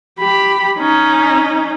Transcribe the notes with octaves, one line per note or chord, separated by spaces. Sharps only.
G4 B5
C#4 D#4